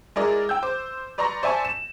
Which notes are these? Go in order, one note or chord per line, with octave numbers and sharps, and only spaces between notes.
G#3 E4 G#4 A#4 D5
G5 E6 G6
C5 D6
B4 D5 A#5 C6 C#6 A#6
C5 D5 E5 G#5 A5 C#6
E7